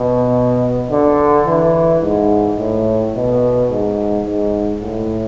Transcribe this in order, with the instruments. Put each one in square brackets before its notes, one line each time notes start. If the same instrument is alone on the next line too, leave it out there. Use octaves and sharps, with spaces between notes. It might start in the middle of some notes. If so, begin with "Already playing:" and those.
Already playing: [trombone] B2
D3
E3
G#2
A2
B2
G#2
G#2
A2